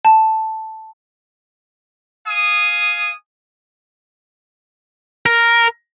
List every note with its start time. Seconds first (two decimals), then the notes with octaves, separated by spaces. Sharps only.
0.05 A5
2.27 F5 G#5 D#6
5.26 A#4